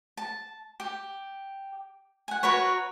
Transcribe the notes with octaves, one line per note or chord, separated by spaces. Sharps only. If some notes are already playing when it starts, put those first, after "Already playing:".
A5
G4
F#5 G#5
F#4 A#4 B4 C#5